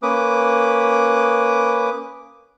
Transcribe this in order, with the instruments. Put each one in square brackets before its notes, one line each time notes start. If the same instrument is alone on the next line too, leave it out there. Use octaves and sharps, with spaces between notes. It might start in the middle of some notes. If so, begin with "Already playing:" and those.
[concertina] A#3 C#4 B4 D6 D#6